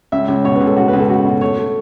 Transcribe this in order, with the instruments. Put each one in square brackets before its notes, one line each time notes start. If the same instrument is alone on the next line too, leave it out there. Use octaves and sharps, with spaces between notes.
[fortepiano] C#2 E5
C#2
B2 C#5
B4
C#2
A4
B2 F#4
C#2 B4
A4
A3 F#4
B2
A3 C#5
A3